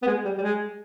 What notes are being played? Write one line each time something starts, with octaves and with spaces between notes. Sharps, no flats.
B3
G#3
G3
G3
G#3